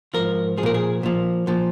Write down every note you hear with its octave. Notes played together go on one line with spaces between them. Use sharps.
G#2 F3 A#4
F3 G#4
A#2 A#4
G#4
A#2 F3
A#2 F3